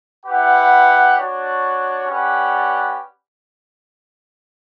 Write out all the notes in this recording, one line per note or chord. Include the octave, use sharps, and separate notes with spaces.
E4 G4 B4 F#5
D4 F#4 C#5
C#4 G4 B4 D5 F#5